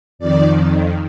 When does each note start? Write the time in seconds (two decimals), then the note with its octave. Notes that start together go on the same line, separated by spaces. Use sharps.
0.19 F2 D#3 D5